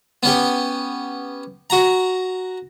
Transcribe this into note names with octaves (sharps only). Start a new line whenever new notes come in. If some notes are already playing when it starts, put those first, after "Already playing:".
B3 C#4 G4
F#4 A#5